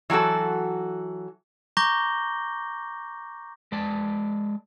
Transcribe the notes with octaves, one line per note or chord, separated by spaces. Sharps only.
E3 F#3 F#4 A4
A#5 C#6 D6 G6 A#6 G7
G#3 D5 A5